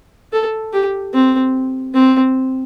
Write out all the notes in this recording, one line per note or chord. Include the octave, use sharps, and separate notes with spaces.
A4
G4
C4
C4